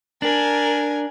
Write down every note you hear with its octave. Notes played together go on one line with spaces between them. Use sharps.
D4 A#4 G#5